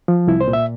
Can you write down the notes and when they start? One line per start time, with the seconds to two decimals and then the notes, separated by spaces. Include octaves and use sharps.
0.08 F3
0.27 C2 E4
0.41 C5
0.48 A#2
0.53 E5